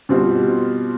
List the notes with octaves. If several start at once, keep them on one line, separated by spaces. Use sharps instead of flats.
B2 G3 C4 F4